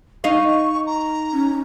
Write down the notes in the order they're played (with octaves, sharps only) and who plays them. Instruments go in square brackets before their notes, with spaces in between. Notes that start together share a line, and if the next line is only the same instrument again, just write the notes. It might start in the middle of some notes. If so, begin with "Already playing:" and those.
[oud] D#4 F5 [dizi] C#6
[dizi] A#5
[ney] C#4